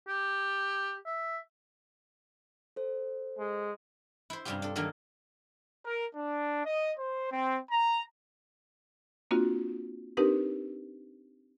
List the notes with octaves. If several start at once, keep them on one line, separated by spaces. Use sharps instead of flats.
G4
E5
A4 C5
G#3
E4 C5
G2 C3 G3 C#4 F4 G4
D4 A4
D#3 F#3 A#3 D4 A4 A#4
A#4
D4
D#5
C5
C4
A#5
A#3 C4 D4 F4 F#4
C4 D4 D#4 G4 A#4 B4